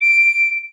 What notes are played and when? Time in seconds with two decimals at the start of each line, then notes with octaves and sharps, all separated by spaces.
0.01 D7